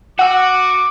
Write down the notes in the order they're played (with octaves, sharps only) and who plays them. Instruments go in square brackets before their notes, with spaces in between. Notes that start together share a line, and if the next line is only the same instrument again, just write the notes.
[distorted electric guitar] F#4 [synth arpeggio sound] F#5 E6 [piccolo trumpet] D6